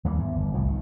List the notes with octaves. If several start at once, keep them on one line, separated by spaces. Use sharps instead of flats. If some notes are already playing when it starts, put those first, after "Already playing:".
D#2 E3 G3 A#3
E2 G#2
G1
C2 A2 F3
D#3